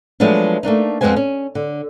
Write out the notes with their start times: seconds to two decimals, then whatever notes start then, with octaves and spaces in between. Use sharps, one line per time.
0.20 F3 F#3 G#3 A3 B3 D4
0.63 A3 A#3 D4 D#4
1.01 F2 C#3 G#3 B3 C5 G#5
1.16 C#4
1.55 D3